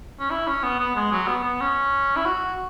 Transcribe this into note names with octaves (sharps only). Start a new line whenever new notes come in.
C#4
E4
C#4
B3
B3
G#3
F#3
B3
B3
C#4
E4
F#4